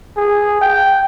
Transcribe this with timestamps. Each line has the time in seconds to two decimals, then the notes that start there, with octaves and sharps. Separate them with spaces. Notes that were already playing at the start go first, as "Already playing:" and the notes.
0.17 G#4
0.61 G5